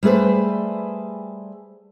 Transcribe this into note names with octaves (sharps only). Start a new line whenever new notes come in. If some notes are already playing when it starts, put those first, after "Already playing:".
G3 A3 G#4 B4 C5